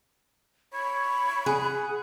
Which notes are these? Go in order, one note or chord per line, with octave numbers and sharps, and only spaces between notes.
C#5 B5
G#4 F#5